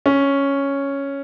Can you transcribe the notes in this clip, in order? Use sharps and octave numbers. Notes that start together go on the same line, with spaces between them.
C#4